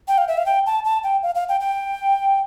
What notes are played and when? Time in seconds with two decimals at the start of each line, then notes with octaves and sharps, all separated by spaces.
0.08 G5
0.18 F5
0.28 E5
0.38 F5
0.46 G5
0.66 A5
0.85 A5
1.04 G5
1.23 F5
1.35 F5
1.49 G5
1.60 G5